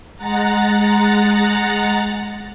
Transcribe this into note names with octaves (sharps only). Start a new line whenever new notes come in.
G#3 F#5 A#5 A6